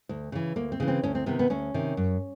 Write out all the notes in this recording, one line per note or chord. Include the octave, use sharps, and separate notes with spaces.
D2
C#3 E3
D2 A#3
C4
C#3 E3
C4
D2 C#4
C4
C3 D#3 B3
B3
D2 C#4
C3 D#3
F#2